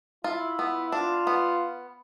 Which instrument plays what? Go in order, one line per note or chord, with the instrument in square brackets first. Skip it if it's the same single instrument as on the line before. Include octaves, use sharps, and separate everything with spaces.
[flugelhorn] E4 [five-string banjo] F4
[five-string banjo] B3
[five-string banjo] D4 [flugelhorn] F4
[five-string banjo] B3